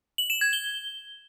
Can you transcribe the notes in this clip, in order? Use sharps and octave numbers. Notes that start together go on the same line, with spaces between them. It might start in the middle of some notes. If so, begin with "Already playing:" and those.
F#7
E7
G#6
G7